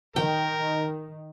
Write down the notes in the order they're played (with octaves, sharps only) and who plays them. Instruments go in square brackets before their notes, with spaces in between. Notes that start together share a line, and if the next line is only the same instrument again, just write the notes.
[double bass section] D#3 [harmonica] A#4 [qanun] G5